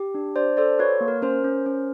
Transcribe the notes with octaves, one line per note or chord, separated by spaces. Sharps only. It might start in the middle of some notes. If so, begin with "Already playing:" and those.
Already playing: G4
D4
D4 C5 D5
A4 C5 D5
F#4 B4 C#5
A#3
A#4
C#4 A#4 C5
C#4
C#4